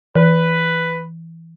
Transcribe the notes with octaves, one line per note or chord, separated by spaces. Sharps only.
E3 B4